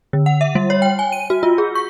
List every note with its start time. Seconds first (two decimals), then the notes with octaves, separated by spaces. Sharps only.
0.13 D3
0.26 F#5
0.41 E5
0.55 G3
0.70 C#5
0.82 G5
0.99 G#5
1.12 D#7
1.30 F#4
1.43 F4
1.58 G#4
1.75 C#6